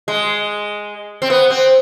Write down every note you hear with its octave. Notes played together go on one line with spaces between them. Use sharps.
G#3
C4
B3
C4